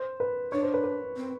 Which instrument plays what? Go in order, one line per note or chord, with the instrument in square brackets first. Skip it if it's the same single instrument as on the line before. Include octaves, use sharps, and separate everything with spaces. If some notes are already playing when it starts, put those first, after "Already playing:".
Already playing: [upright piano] C5
B4
[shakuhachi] D4 [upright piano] C#5
[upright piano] C5
B4
B4
[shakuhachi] C4